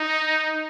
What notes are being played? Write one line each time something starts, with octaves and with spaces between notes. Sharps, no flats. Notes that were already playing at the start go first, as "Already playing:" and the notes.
Already playing: D#4